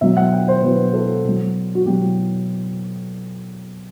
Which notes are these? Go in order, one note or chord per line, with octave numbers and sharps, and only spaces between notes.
B2 F#3 E5
F#5
G5
C5
B2 F#3 B4
A4
B2 F#3
F#4
B2 F#3 G4